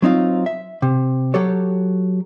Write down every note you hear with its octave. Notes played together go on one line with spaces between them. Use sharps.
F#3 C4 D#4 F4
E5
C3
F#3 G4 A4 C#5